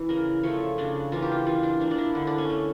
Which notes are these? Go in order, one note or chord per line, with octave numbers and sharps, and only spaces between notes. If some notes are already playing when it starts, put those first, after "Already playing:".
Already playing: E3 E4
C#3 A#4
F3 A3 C#5
C#3 D4
E3 A#3 F4
G4
F4
E3 F4
D4
A#3 D4
D4
E4
D3
D4
C#4
A3